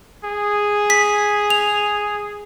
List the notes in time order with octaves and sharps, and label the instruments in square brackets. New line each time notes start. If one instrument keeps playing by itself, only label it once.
[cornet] G#4
[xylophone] B6
F7